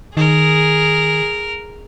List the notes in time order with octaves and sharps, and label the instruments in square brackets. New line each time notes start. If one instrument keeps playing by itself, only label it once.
[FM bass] D#3 [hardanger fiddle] G#4 [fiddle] A#4